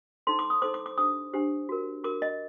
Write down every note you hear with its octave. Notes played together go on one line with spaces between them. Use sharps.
D#4 A4 C5 C6
D6
D#6
D#4 A4 C5 D6
D6
D6
D4 G4 C5 D#6
D4 G4 C5
F#4 A#4
F#4 A#4 D6
D#5